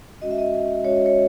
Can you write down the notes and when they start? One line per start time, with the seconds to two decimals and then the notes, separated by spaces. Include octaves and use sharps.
0.21 G#3 C#4 F#4 D#5
0.31 E5
0.38 D#5
0.84 G#3 C#4 F#4 C#5
0.95 D#5
1.06 C#5